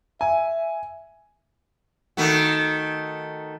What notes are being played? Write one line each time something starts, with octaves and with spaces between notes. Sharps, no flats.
E5 G#5
D#3 A3 F#4